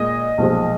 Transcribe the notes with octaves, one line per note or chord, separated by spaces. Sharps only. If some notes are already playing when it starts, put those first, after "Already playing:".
Already playing: A#2 G#3 D#5
B1 A#2 F3 G#3